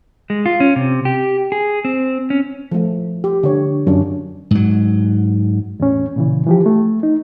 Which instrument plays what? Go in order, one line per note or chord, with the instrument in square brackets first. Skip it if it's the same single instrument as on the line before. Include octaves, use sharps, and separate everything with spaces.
[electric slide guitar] G#3
F4
C#4
C3
G4
G#4
C4
C#4
[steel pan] F3 A3
G4
D3 D4 C#5
[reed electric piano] F#2 [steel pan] C#4 D4
[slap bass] G#2 F#3
[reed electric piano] E2 A2 C#4
A#2 C#3 E3
E3 F3 G4
A3
D#4